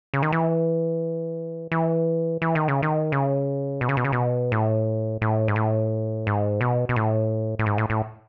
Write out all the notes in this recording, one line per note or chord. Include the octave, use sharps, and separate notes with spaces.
C#3
D#3
E3
E3
E3
D#3
C#3
D#3
C#3
B2
C#3
B2
C#3
B2
A2
A2
G#2
A2
G#2
B2
B2
A2
A2
G#2
A2
A2